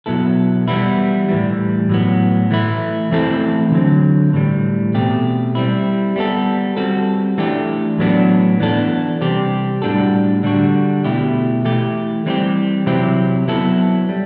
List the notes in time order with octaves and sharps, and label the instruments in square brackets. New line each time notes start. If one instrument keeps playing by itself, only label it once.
[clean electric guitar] B2 F#3 B3 E4 A4
E3 G3 B3 E4
A2 E3 G3
A2 F#3 B3
E3 A3 E4
E3 A3 C4 E4 A4
D3 F#3 C4
A2 E3 G3
B2 A3 C4 G4
G3 C4 E4
G3 B3 F#4 A4
G3 C4 F#4 A4
E3 A3 D4 G4
A2 F#3 B3 D4
E3 B3 D4 A4
C3 G3 C4 G4
A2 G3 D4 F#4 A4
D3 G3 D4 F#4
B2 A3 E4 G4
E3 A3 E4 G4
E3 G3 C4 E4 G4
C3 F#3 C4 E4 G4
F#3 B3 E4 A4
G3